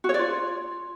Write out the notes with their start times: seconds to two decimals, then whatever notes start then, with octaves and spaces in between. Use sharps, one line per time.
0.04 F#4
0.09 C#5
0.14 D5
0.19 F4